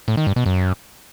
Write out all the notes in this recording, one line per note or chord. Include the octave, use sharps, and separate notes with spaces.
A2
D#3
G2
B2
F#2